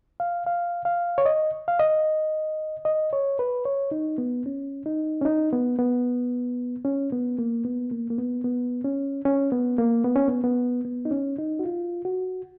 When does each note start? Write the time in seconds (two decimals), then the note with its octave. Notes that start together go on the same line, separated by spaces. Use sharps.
0.20 F5
0.46 F5
0.85 F5
1.18 C#5
1.26 D#5
1.68 F5
1.80 D#5
2.85 D#5
3.13 C#5
3.39 B4
3.65 C#5
3.91 D#4
4.18 B3
4.46 C#4
4.86 D#4
5.21 C#4
5.25 D#4
5.52 B3
5.79 B3
6.85 C#4
7.12 B3
7.39 A#3
7.65 B3
7.91 A#3
8.10 A#3
8.18 B3
8.44 B3
8.85 C#4
9.25 C#4
9.52 B3
9.78 A#3
10.05 B3
10.16 C#4
10.28 B3
10.44 B3
10.85 B3
11.05 D#4
11.11 C#4
11.38 D#4
11.59 F#4
11.65 F4
12.05 F#4